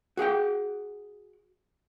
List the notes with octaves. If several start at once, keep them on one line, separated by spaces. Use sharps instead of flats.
F#4 G#4 F#5 G5